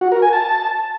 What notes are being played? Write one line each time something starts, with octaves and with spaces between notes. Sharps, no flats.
F#4
A#4
G#5
A5